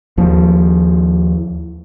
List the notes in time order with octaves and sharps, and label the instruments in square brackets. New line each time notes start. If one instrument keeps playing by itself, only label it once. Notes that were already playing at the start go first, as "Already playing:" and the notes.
[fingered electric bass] D#2 F3